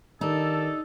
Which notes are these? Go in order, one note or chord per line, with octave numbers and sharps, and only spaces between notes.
D#3 D4 D#4 G4 A4